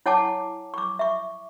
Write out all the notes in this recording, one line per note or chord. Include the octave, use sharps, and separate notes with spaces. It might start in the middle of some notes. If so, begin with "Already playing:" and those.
E4 C#5 F#5 G#5 A5 D6
C#6 D6
E5 C#6